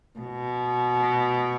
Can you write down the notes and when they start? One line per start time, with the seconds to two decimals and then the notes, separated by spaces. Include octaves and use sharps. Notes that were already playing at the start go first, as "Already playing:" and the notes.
0.19 B2